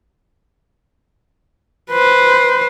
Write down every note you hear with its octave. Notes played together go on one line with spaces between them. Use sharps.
B4 C5